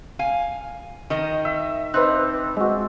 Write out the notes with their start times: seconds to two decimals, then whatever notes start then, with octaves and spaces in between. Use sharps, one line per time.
0.19 F5 G#5
1.10 D#3 A#4 D#5
1.45 E5
1.94 C4 D4 D#4 B4 F#6
2.57 G#3 F#4